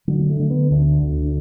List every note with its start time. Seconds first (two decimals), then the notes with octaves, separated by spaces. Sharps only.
0.08 D3 F#3
0.29 A3
0.40 D3
0.50 B3
0.71 D2 D4
1.03 D2
1.25 D4